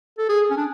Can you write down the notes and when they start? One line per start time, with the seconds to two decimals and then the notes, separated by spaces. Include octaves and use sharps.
0.18 A4
0.29 G#4
0.51 C#4
0.57 D4